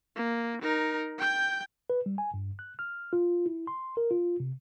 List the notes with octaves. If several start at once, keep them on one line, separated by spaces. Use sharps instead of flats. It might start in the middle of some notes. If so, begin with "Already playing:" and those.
A#3
D#4 A#4
G5 G6
B4
G3
G#5
G2
F#6
F6
F4
E4
C6
A#4
F4
C3